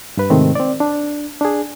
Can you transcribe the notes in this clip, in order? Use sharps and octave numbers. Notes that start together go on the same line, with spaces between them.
G2 B4
G#2 C3 D#3 A3 C4
C4 D5
D4
D4 G#4